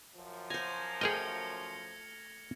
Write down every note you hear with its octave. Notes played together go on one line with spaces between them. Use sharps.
F#2 F3
C5 G#5 G#6 A#6 F7
A3 G#4 A#4 D#5 G5 F6 C#7